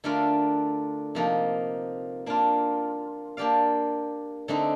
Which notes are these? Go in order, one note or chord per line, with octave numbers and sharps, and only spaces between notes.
D3 A3 D4 F4 A#4
C3 F3 A#3 D#4
A#3 D4 F4
A#3 D4 G4 D5 F5
D3 A3 C4 D#4